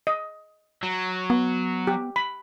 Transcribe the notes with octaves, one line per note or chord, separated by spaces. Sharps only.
D#5
F#3
B3
G4
B5